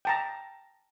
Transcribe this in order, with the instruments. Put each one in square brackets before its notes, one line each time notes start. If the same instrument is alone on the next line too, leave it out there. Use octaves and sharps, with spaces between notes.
[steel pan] G5 A5 A#5